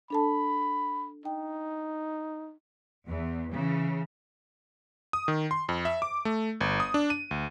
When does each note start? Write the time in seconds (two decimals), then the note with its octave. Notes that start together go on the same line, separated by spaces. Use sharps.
0.10 D4 A4 A5 B5
1.25 D#4 G5
3.06 E2
3.50 C#3 E3
5.13 D#6
5.28 D#3
5.51 C6
5.69 F2
5.85 E5
6.02 D6
6.25 A3
6.61 G1
6.80 D#6
6.94 D4
7.10 D#7
7.31 D2